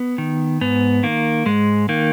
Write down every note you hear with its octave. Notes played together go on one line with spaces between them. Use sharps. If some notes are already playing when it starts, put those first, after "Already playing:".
Already playing: B3
D#3
G#2 B3
D#3 A#3
G#2 G#3
D#3 A#3